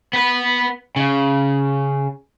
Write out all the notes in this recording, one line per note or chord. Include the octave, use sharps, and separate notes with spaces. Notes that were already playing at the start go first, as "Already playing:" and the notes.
B3 B4
C#3